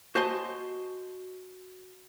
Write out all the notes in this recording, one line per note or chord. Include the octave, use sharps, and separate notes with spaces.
F#4 C5 D#5 G#5 A5 C6